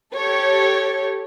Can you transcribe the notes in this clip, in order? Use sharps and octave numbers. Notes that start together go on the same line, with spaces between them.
G4 A4 C#5